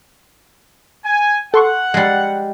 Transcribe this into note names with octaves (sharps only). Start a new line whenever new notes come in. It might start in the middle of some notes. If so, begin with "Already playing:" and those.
G#5
A4 F#5 C6 C#6
G3 G#3